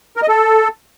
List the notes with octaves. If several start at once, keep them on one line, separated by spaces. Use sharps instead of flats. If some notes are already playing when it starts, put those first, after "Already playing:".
A#4
D#5
A4